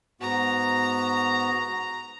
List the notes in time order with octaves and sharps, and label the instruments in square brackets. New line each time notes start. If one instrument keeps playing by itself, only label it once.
[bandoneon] G#2 B3 F#4 [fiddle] A#5